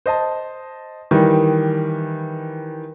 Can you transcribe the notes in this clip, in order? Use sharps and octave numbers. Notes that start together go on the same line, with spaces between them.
C5 D#5 A5
D#3 E3 G3